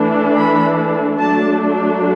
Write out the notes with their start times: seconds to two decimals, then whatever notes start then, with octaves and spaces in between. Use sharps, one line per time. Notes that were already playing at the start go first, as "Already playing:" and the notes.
Already playing: E3 A3 D4
0.36 B5
1.17 F#3 A3 D4 A5